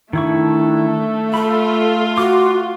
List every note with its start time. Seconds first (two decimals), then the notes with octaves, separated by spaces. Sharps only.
0.13 D#3 A3 D4 E4 C#6
1.34 F4 A4 B5
2.18 F#4 C6 D6